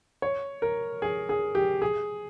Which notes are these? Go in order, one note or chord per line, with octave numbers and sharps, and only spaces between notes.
C#5
A#4
G#4
G#4
G4
G#4